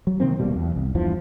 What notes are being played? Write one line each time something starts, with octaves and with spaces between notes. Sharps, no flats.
F#3
C3 D#3 A#3 C4
D#1 B2 G3 A#3
E2
C2
E2 G2 E3 F3